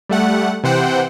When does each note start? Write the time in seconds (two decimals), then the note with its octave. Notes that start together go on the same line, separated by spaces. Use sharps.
0.09 G3 A3 F#5
0.63 C3 E3 C5 F#5 G5